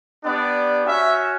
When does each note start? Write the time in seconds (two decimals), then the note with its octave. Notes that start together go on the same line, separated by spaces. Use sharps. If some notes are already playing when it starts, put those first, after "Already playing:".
0.23 B3 D4 G4 D5
0.86 C#4 F#4 E5